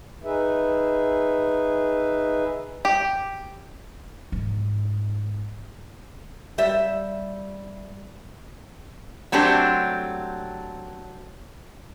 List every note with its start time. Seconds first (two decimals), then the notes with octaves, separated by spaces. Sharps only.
0.24 D#4 G#4 B4 E5
2.85 G4
4.32 G#2
6.58 G3 E5
9.32 F#3 A3 C4 D4 G4